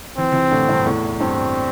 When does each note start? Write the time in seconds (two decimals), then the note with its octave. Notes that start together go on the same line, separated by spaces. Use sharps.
0.17 E3 C4
0.32 C3 E3
0.51 A2 D3
0.69 G2 C3
0.86 E2 A2
1.20 G2 C4